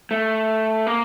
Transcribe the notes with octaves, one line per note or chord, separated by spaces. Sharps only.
A3
A#3